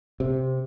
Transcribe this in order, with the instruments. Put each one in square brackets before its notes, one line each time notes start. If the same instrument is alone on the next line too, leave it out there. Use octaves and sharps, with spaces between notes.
[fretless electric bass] C3